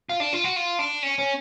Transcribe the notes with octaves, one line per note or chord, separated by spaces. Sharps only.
F4
D4
F4
F#4
F4
D4
C#4
C#4